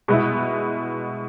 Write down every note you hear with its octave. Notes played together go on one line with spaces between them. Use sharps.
B2 G#3 B3 E4